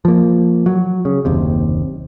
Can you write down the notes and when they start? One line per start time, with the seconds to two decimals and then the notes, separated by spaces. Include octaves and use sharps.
0.05 F3 A#3
0.66 F#3
1.05 C#3
1.25 F#1 D#2 C3